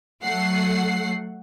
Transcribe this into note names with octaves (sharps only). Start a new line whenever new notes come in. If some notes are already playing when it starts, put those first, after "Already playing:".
F#3 A3 F#5 C7